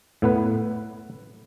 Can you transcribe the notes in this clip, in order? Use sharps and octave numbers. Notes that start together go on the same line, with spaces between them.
A2 B3 B4